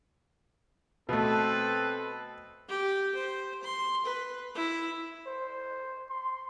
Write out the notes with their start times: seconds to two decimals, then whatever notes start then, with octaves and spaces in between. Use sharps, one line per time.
1.09 B2 A3 C4 A4 B4
2.69 G4
3.15 C5
3.63 C6
4.05 B4
4.55 E4
5.26 C5
6.10 C6